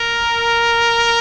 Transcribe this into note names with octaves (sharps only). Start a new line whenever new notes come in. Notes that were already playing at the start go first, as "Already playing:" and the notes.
Already playing: A#4